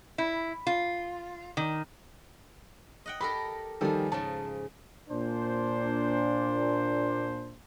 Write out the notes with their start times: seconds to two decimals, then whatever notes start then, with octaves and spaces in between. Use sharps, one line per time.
0.18 E4
0.67 F4
1.57 D#3
3.06 D#5 F#5 G5
3.21 G4 A4 A#4 B5
3.81 D#3 F3 G3 G#4 A4
4.12 G#2 C#3 A5
5.10 A#2 D4 C5